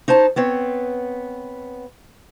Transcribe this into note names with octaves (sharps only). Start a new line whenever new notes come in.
D#4 C5 C#5 A5
B3 C4 C#5